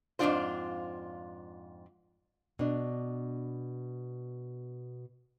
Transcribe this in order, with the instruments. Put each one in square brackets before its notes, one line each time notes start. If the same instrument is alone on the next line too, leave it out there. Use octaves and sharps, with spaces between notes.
[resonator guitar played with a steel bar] F2 G#2 C#3 D4 F4 C5
[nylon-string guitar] B2 D4